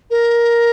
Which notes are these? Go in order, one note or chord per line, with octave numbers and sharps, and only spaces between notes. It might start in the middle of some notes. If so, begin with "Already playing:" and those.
A#4